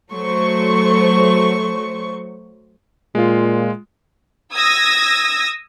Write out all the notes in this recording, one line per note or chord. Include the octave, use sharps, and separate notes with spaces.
F#3 A3 C5 C#6
A#2 G#3 F4
D#6 E6 G#6 A#6